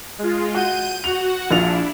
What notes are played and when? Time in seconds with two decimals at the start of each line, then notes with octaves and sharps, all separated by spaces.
0.18 G#3 F4
0.55 F#4 G6 D#7
1.04 F#4 F#5 F7
1.51 A#1 D4 E4 F4 F7